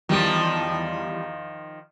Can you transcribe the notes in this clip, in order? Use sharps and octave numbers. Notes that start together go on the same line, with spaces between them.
E2 D#3 F3 G3 D7